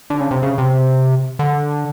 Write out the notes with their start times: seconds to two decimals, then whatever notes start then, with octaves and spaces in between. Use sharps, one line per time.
0.10 D3
0.20 C#3
0.31 C3
0.43 C#3
0.58 C3
1.39 D3